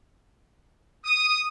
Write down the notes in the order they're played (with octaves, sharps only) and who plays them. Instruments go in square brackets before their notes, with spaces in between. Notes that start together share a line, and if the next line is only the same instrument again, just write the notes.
[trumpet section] D#6